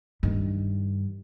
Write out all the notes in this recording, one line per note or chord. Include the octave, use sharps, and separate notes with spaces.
G2 D#3